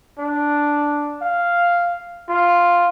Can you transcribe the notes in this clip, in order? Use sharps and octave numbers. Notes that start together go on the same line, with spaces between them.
D4
F5
F4